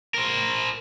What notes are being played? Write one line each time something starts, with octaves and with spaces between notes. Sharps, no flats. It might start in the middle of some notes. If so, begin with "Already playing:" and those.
A#4 C5